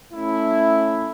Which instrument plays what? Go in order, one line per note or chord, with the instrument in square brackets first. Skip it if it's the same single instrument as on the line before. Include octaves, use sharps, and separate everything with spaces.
[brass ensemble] A3 C#4 E4